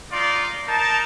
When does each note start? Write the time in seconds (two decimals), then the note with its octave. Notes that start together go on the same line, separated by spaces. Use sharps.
0.13 D#4 F4 D5 C6
0.68 D#4 A#4 A5